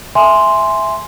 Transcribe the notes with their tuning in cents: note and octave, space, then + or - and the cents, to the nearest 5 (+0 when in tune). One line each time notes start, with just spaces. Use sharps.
E5 +0 G#5 +0 C6 +0